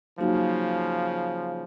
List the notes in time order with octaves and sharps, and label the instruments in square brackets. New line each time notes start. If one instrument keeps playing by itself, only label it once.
[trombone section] C#3 F3 [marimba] F#3 A#3 D#4 F#4